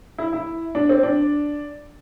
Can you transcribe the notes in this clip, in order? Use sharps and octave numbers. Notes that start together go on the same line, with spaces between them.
E4
E4
D4
C4
D4